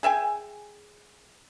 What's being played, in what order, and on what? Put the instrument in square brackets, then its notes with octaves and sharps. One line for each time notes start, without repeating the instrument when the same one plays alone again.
[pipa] G#4 E5 G5 G#5